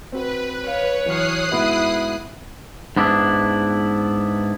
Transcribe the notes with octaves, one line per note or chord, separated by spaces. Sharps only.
C4 F#4 B4
C#5 F5
E3 F#3 D#6 F6 F#6 C7
G#2 B3 E4 F#4
G#2 B3 D4 E4